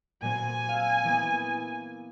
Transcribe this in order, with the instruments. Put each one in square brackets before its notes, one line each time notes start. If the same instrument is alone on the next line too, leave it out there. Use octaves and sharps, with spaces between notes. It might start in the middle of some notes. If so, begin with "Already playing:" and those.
[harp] A#2 F#3 C4 [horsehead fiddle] G#5
[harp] F5 E6
E3 A#3 B3